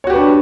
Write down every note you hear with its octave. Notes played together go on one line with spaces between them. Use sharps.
D4 F#4 G4 B4 C#5